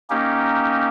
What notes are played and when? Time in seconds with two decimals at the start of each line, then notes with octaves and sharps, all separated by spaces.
0.10 A#3 C#4 D#4 G4